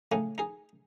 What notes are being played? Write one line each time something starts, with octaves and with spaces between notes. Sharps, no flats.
A2 C#3 A3 D#4 G#5
D#4 G#4